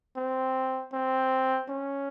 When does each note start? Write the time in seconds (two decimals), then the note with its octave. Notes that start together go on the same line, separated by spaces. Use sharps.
0.17 C4
0.93 C4
1.69 C#4